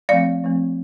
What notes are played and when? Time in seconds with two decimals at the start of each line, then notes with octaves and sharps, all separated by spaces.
0.09 F3 A3 C4 D5 F5
0.44 F3 A3 C4